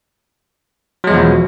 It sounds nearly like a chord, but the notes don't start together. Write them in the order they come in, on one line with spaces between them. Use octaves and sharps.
F#3 G#3 E2 F3 B2